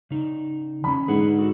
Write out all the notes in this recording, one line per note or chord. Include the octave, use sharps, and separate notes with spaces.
C#3 D#4
E3 C#4 B5
G#2 D3 G#4 B4 F#5
F#4 A4